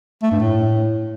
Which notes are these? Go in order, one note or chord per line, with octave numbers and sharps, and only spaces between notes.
A3
G2
A2